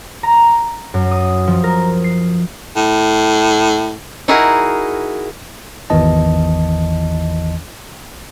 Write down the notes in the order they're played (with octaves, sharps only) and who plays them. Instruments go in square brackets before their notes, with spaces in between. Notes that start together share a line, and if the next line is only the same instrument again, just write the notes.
[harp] A#5
F#2
D#6
F3
A#4
C7
[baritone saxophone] A2
[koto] D#4 E4 F#4 G#4 A#4
[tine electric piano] G#1 E2 D#3 E3 D#5 A5